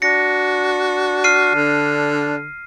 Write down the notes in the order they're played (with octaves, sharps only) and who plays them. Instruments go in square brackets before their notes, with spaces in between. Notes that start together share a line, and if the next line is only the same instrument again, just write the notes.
[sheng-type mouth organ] D4 [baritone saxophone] F#4 [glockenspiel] A#6 C#7
[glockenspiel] F6 C7 D#7
[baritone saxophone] D3